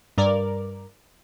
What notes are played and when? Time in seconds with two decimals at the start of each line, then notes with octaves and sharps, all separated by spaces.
0.18 G2 A#4 D5